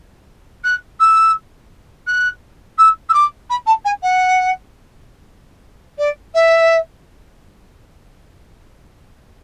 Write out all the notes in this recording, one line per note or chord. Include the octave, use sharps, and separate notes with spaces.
F#6
E6
F#6
E6
E6
D6
B5
A5
G#5
F#5
D5
E5